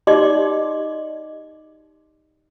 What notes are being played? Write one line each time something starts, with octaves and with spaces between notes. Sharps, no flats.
D#4 G4 D5 D#5 C6 D6